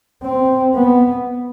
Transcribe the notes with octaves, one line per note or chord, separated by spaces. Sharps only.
C4
B3